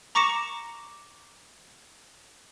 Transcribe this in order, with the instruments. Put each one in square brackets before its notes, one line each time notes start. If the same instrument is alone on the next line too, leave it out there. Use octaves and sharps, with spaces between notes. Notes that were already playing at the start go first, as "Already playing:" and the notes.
[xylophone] A#5 C#6 D6 A#6 C#7 E7